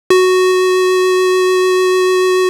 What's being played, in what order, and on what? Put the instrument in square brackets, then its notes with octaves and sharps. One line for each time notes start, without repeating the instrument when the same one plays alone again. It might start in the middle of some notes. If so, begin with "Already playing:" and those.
[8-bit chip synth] F#4